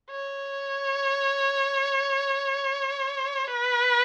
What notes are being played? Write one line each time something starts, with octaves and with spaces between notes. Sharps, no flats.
C#5
B4